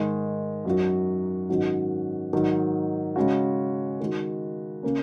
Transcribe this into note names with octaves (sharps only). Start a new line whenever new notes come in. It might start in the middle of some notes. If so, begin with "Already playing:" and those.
Already playing: G#2 D#3 G#3
F#2 F#3 D#4 F#4
G#2 D#3 F#3 C#4 F#4
G#2 D#3 F#3 D#4
C#3 G#3 C#4 F#4
D#3 G#3 F#4
C#3 A#3 C#4